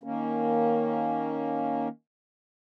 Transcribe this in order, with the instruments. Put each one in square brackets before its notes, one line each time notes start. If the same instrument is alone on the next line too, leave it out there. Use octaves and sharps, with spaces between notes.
[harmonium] D#3 A#3 C#4